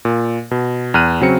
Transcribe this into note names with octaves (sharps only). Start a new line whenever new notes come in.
A#2
B2
E2 F6 F#6 D#7
C#3 F#3 C4 C#7